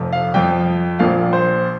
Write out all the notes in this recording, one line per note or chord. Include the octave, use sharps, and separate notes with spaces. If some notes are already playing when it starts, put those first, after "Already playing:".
Already playing: F1 F2 F3
F5
F2 F3 G5
A#1 A#2 F3 F5
C5